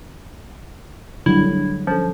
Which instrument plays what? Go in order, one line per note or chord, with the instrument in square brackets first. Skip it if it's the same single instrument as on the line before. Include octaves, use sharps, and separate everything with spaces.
[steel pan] D3 F#3 G3 [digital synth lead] E4
[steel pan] D4
[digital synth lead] F3 [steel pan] C#4 A4